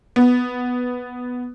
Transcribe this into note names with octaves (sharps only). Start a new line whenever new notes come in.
B3